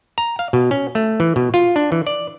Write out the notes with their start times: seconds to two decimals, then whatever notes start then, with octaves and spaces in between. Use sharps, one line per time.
0.18 A#5
0.39 F5
0.53 B2
0.71 C#4
0.95 A3
1.20 E3
1.36 B2
1.54 F4
1.76 D4
1.92 E3
2.07 D5